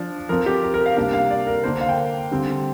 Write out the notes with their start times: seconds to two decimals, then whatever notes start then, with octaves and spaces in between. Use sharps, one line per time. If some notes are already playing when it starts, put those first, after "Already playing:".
Already playing: F3 D4
0.29 F3 C4 A#4
0.46 G4
0.63 A#4
0.74 A#4
0.86 F5
0.96 C3 G3 A#3 D4 F5
1.13 F5
1.31 D5
1.47 A#4
1.64 D3 A#3 D4 C5
1.81 F5
1.89 G5
2.31 D3 G3 C4